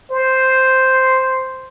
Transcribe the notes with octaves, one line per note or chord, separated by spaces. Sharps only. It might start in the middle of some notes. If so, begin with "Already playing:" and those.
C5